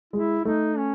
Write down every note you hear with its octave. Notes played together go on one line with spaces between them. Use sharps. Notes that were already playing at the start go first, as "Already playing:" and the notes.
G#3 E4
A3 D#4
C#4